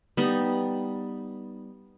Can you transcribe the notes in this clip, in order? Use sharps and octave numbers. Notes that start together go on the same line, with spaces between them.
G3 B3 D#4